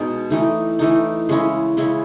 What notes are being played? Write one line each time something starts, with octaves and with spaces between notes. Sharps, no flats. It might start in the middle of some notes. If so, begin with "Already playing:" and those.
Already playing: B2 G#3 B3 D#4
E3 A3 D#4
E3 A3 D#4
C#3 G#3 C#4 E4
C#3 G#3 C#4 E4